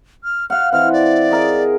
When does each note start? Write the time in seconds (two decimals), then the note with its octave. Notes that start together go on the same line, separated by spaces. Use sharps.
0.24 F6
0.50 F5 F#5 F6
0.72 E3 C4 D#5 F6
0.93 D5
1.31 G#4 A#4 D#5